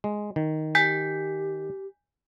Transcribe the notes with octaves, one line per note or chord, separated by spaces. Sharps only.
G#3
D#3
G4 G#5 G6 B6